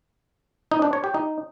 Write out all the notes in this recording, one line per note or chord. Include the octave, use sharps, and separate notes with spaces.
D#4
D4
C#5
G4
D#4